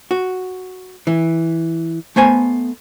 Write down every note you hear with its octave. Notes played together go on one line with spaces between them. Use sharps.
F#4
E3
A3 B3 C5 G#5